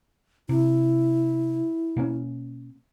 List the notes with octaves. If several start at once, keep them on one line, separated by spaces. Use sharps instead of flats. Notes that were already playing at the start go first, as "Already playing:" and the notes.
C3 E4
B2 A#3 C#4